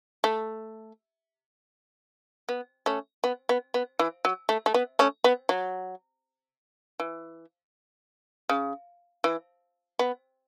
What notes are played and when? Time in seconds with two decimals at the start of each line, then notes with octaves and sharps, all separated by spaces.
0.24 A3
2.49 B3
2.86 A3 C#4
3.24 B3
3.49 B3
3.74 B3
3.99 E3
4.25 F#3
4.49 A3
4.66 A3
4.74 B3
4.99 A3 C#4
5.24 B3
5.49 F#3
7.00 E3
8.49 C#3
9.24 E3
9.99 B3